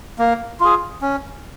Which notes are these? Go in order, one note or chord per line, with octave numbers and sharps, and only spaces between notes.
A#3
F4 G#4
C#4